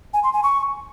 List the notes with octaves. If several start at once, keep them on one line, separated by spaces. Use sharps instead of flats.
G#5
C6
G#5
C#6